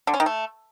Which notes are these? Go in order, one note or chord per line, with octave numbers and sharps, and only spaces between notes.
D3
C#4
D#3
A3